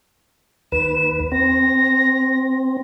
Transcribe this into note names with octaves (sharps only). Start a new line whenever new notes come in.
D#2 B4 E7
C4 A#6